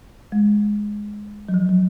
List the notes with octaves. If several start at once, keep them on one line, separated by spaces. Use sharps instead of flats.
G#3
F#3
F3
F#3